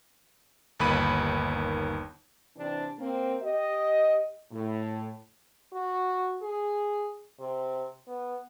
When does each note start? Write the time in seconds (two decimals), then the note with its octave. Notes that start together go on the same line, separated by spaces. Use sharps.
0.80 G1 D#2 D#3 B5 D#7
2.57 C3 E3 C4 D4
2.98 A#3 C4
3.42 G4 D#5
4.51 A2
5.73 F#4
6.42 G#4
7.40 C3
8.08 B3